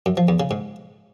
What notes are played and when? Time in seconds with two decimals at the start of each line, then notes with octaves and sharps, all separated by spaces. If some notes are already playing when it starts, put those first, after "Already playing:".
0.06 F#2
0.17 F3
0.28 E2
0.40 C#3
0.51 G#2